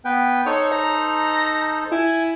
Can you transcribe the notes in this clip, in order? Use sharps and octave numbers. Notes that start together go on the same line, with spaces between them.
B3 B4 G5
D#4 A4 C5 C#5
A#5
E4 G#5